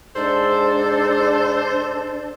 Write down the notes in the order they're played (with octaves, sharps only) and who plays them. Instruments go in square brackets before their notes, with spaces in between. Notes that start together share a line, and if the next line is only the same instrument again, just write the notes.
[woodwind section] G#2 A4 [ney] D4 [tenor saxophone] C5 [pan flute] D5